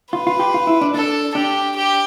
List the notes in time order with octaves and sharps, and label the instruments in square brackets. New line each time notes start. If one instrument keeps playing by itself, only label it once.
[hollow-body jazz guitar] F4 [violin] B4
[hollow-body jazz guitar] F4
G4
F4
E4
D4
[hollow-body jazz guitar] D4 [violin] A4
[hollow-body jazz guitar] D4 [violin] G4
[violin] G4